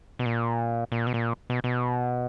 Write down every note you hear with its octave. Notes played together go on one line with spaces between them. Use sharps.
B2
A#2
A#2
B2
A#2
B2
B2